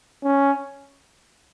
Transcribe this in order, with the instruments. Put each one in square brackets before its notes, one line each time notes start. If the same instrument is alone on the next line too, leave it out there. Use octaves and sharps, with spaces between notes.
[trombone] C#4